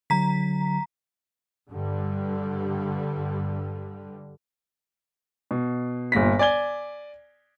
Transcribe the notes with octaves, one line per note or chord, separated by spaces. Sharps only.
D3 F#3 A#5 B6
G2 D3 G3
B2
G1 A#2 A#6 B6
D5 G#5 G#6 G7